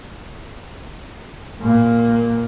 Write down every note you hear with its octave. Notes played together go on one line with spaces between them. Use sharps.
A#2 A#3